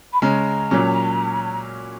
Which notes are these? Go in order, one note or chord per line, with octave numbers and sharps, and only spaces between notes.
B5
C#3 G#3 C#4 A#5
A#2 F#3 C#4